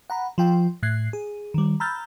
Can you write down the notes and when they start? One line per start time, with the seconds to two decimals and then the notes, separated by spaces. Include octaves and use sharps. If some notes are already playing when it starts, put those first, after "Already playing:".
0.10 F#5 A#5 B5
0.38 F3 F4 G5
0.83 A2 F#6 G#6 C7
1.13 G#4
1.54 D#3 G3
1.80 A#5 B5 E6 F6 G6 A6